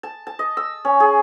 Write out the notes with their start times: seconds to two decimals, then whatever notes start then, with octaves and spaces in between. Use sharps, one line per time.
0.03 A5
0.27 A5
0.39 D#5
0.57 E6
0.85 C#4
1.00 G#4